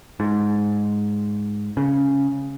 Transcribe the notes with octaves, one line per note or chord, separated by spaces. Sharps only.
G#2
C#3